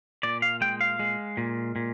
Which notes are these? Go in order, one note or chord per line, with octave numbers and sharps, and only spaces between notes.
A#2 D5
F5
G#3 G5
F5
G#3
A#2
A#2